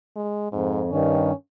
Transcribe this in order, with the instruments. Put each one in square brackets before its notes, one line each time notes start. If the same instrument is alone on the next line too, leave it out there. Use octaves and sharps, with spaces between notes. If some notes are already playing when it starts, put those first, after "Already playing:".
[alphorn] G#3
[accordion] F2 [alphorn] G#2
[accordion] G2 D#3 [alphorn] C#4